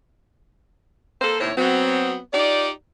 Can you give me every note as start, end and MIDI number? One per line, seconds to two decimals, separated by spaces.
1.22 1.40 58
1.22 1.40 69
1.22 1.40 72
1.41 1.52 39
1.41 1.52 45
1.41 1.52 48
1.41 1.52 64
1.41 1.52 72
1.41 1.52 73
1.58 2.17 54
1.58 2.17 59
1.58 2.17 60
2.33 2.69 63
2.33 2.69 65
2.33 2.69 67
2.33 2.69 74